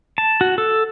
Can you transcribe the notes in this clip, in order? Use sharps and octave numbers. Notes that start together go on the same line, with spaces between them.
A5
F#4
A4